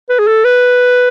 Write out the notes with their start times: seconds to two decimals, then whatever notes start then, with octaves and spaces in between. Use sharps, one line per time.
0.09 B4
0.19 G#4
0.27 A4
0.45 B4